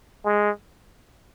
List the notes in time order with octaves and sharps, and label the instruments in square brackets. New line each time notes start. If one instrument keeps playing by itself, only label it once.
[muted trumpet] G#3